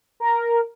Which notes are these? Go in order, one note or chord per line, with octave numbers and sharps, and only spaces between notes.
A#4